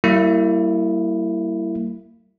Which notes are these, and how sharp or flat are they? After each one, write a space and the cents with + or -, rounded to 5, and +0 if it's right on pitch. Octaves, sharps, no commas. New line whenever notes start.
G3 -40 A#3 -30 E4 +0